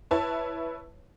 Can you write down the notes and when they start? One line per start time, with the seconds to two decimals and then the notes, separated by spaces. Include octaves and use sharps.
0.11 E4 B4 C#5 A5